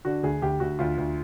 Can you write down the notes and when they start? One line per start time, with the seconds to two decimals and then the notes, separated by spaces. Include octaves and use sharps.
0.05 D3 F#4
0.23 D2 G#4
0.42 D2 G4
0.60 D2 F#4
0.79 D2 F4
0.98 D2